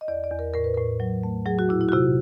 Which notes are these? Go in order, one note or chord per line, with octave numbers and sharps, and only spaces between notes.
D#5
E2 D5
D5
E2
A#4
A2 A#4
B4
A2 A#4
F#3
A3
F#3 G#4
F#4
A#2 E4
E4
F#4
C3 F4